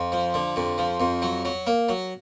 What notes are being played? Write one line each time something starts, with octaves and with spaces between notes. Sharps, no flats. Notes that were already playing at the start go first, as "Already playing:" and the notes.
Already playing: F2
F3
D3
F2
F3
F2
F#3
F#3
A#3
F#3